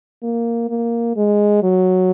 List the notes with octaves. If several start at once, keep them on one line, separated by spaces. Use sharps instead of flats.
A#3
A#3
G#3
F#3